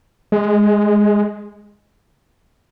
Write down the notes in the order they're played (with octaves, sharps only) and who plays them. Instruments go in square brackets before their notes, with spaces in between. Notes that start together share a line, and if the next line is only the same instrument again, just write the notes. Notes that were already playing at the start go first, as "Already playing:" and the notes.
[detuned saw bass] G#3